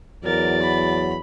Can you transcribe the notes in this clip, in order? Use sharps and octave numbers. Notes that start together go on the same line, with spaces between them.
E2 F#3 A#4 D5 A6
B5